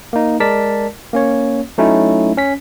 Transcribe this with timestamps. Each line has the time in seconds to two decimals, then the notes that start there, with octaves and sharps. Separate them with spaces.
0.13 A#3 D#4
0.40 G#3 A#4 D5 A5 B6
1.13 A#3 C#4 C#5
1.78 F#3 A3 C#4 D#4 E4
2.37 C#4 B6